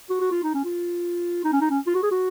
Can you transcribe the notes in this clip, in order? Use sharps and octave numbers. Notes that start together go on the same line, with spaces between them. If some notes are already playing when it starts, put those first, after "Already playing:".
F#4
F#4
F4
D#4
C#4
F4
D#4
C#4
D#4
C#4
F4
F#4
G#4
F#4